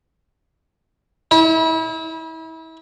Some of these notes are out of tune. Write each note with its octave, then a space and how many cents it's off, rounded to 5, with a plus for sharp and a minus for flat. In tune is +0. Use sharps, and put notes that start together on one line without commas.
E4 -35